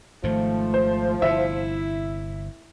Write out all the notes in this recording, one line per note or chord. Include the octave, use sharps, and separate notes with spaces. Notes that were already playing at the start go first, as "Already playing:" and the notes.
G#1 G#2 D#3 F3 A3
C5
G1 C3 E4 E5